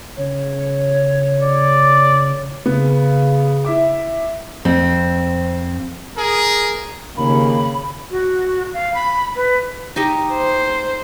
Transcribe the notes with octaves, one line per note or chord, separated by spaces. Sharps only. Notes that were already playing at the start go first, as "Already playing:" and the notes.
C#3 C#5
D5
C#3 B3
E4 E5 D6
F2 C4
G#4 A#4
D#2 C#3 A#3 B5
F#4
F5
B5
B4
D#4 G4 D#5
C5